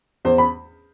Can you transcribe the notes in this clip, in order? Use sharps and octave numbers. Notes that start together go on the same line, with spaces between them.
E2 C5
B5